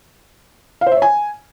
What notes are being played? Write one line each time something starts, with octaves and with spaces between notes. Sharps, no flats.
F5
C5
E5
C#5
G#5